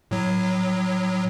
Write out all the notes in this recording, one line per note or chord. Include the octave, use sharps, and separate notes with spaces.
A2 F#3